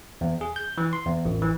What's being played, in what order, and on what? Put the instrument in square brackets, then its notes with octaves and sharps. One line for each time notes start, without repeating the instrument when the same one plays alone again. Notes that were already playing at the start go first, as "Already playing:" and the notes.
[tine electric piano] E2
G#4
G6
E3
C6
E2
A1
E3